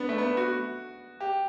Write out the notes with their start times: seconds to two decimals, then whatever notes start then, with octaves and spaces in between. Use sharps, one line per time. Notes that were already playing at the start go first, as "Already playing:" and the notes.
Already playing: B3 D4
0.09 A3
0.18 B3
0.37 F#4
1.20 G4